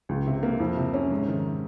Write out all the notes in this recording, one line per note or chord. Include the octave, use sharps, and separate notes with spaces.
C#2
C3
A#3
F2
C3
C#4
G#2
D#3